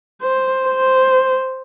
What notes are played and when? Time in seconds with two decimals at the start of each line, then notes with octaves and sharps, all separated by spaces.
0.22 C5
0.67 C5